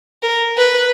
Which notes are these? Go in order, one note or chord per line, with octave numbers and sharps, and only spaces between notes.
A#4
B4